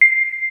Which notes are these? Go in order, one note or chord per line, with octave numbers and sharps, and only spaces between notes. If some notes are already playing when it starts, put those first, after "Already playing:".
C7